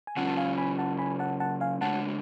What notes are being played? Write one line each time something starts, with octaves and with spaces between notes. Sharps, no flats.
G#5
C#3 F#3 C#4 F4 F#5 A5
A5
F5 G#5
G#5 B5
F#5 A5
G#5 B5
F#5 A5
F#5 A5
F5 G#5
C#3 G#3 D4 F#4 F#5 A5